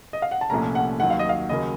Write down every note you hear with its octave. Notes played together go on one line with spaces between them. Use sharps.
D#5
F5
F#5
A5
C2 A#2 F3 A3 C#4 A#5
F#5
D#2 D#3 F#3 F#5
F5
D#5
F5
D#2 C#3 F#3 A#3 D#5